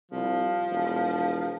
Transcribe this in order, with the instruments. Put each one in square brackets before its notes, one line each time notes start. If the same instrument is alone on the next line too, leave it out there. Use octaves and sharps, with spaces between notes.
[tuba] C2 [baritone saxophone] F3
[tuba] E1